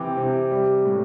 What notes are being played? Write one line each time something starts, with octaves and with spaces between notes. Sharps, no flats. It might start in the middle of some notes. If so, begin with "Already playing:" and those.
Already playing: C3 E3 C4 G5 D6
C3
G3
A2